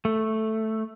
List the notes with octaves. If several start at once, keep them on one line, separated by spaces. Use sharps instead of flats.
A3